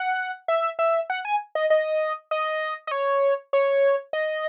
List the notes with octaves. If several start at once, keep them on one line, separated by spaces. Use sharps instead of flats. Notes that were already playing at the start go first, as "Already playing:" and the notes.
Already playing: F#5
E5
E5
F#5
G#5
D#5
D#5
D#5
D#5
C#5
C#5
D#5